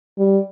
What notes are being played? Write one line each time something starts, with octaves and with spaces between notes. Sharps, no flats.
G3